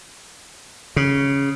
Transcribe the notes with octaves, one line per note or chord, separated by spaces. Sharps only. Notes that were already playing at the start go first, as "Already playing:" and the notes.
C#3